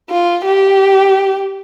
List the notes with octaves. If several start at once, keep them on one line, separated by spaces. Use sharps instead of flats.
F4
G4